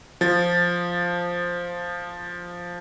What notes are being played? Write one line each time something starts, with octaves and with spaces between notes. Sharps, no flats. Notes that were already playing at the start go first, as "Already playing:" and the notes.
F3 A6